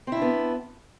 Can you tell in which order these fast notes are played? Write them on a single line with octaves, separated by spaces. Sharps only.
C4 E4 D4 B3